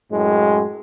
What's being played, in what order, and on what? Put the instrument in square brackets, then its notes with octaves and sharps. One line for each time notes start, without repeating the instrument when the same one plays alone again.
[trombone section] F#2 A2 G#3